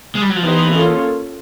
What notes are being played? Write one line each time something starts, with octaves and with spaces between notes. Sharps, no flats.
G#3
G3
F#3
F3
E3 B3 D#4 G4 C5 D#5
A#3 C#4 F4 A4